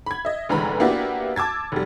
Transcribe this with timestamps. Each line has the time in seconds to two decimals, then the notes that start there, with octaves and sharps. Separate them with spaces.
0.06 B5 G#6
0.25 D#5 E5
0.49 F1 D3 E3 G#3 A#5 B5
0.80 A#3 B3 D4 E4 F#4 G4
1.36 A5 D6 E6 G#6 A6
1.72 F1 G3